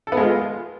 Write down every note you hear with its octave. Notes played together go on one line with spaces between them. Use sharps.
A4
B3
G#3
F4